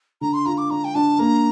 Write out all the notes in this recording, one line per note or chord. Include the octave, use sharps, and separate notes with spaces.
D3 A#5
C6
F4 A#5
D6
D4 A#5
G5
D4 A5
A#3 A#5